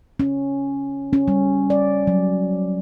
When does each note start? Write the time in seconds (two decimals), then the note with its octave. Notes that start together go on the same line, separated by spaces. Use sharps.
0.20 C#4
1.13 C#4
1.28 G3
1.70 D5
2.07 F#3